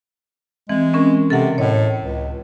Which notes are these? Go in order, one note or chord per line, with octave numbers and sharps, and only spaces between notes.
E3 G#3 C4
C4 C#4 A#4
C3 A4 A#4 F#5
A2 C#5 D#5
C#2